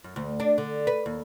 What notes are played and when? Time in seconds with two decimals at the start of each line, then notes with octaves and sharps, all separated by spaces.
0.04 F#2
0.16 D2
0.40 D4
0.58 D3
0.87 B4
1.06 D#2